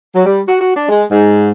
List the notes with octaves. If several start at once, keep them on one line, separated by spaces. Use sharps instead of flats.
F#3
G3
F#4
F#4
D4
G#3
G#2